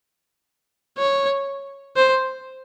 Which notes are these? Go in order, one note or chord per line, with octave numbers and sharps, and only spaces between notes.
C#5
C5